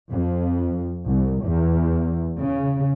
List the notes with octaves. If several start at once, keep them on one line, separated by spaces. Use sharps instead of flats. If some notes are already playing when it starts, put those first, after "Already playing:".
F2
C2
E2
C#3